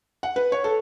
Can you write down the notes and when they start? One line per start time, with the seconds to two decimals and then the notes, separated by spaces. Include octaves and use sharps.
0.23 F#5
0.36 B4
0.52 C#5
0.64 A4